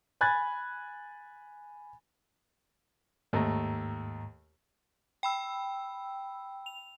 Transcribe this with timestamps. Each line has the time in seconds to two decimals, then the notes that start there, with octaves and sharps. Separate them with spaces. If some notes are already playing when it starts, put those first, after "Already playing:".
0.21 G#5 B5 F#6 G#6 A6
3.33 D#2 G#2 A3 A#5
5.23 G5 B5 E6
6.66 F7